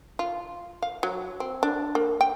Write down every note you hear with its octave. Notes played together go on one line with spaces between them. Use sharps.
F4
F5
F#3
C4
D4
A#3
G5